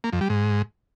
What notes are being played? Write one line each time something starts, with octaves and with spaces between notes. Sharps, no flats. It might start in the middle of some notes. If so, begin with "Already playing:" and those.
A#3
F2
G3
G#2